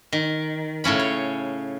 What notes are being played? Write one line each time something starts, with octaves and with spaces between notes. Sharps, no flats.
D#3
A2 C#3 C#4 B5
C#5